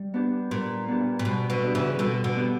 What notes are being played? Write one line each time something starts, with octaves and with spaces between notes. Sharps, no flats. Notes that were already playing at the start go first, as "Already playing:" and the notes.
Already playing: G3
B3 D4 G4
A#2 G3
B3 D4 G4
A#2
B2 G3
B2 D3
B3 D4 G4
C#3 E3
B2 D3 G3
B2 D3
B3 D4 G4